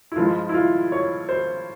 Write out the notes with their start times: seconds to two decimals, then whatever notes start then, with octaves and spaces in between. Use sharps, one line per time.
0.12 E4
0.16 G2 F3 G#3 F4
0.49 E4
0.54 F4
0.92 C#5
1.29 C5